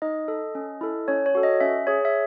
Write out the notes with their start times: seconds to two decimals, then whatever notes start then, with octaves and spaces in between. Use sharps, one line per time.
0.02 D#4 D#5
0.28 A4
0.55 C#4
0.81 E4 A4
1.08 C#4 C#5
1.26 C#5
1.35 F#4 A4
1.43 D#5
1.60 C#4 E5
1.87 G#4 C#5
2.05 E5